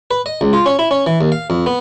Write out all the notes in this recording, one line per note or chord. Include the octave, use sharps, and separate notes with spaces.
B4
D#5
C#2
F4
C#4
E4
C#4
E3
D#2
F5
F2
B3